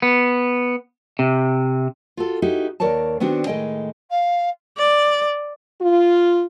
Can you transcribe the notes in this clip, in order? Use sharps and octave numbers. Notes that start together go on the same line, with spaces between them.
B3
C3
F4 F#4 A4
D#4 E4 F#4 G4
D#2 A#4 C#5 D5 A5
D#3 B3 C4 D4 F#4
A2 D#3 G#3 D#5 G5
F5
D5
F4